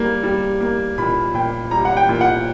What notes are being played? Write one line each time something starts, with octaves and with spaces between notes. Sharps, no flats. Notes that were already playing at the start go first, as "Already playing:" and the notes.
Already playing: G3 A#3
G3
A#3
A#2 B5
A#2 G5
G3 A#5
F#5
G5
A#2
F#5